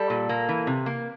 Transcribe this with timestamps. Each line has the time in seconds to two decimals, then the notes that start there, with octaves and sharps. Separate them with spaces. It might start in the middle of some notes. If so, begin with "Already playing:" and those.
Already playing: G3 A4
0.10 A#2
0.29 A#3
0.49 E3
0.67 C3
0.86 A#3